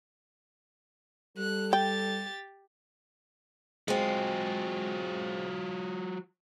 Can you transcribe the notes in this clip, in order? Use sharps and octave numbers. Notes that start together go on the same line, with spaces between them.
G3 A4 F#6
G4 G5 A6
F#3 G#3 C4 F4